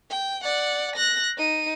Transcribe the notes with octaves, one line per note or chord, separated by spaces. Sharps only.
G5
D5 F#5
F#6 A#6
D#4 D#7